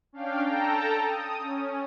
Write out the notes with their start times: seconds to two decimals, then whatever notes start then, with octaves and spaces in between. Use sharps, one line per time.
0.13 C#4 D4 F5 G5
0.44 A4 G5 A5 A#5
1.03 D#6
1.40 C#4